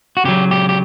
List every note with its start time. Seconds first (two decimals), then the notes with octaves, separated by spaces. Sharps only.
0.17 F#4
0.25 C#3 F#3 G4
0.51 G4
0.69 G4